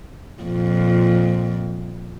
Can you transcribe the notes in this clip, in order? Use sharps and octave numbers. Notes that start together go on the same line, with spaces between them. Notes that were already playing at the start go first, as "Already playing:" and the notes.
F2 A#2